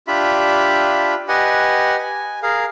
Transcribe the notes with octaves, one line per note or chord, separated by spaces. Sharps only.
D4 F4 G4 E5 B5
G4 B4 D#5 F#5 G#5
G#5
G#4 A#4 F5